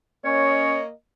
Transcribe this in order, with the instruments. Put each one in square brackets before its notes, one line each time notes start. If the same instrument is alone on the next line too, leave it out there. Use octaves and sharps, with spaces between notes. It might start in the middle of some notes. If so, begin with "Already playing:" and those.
[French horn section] A#3 D#5 [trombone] C#4 [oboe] C#5